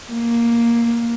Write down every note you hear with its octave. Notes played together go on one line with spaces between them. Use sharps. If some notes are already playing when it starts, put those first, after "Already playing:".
A#3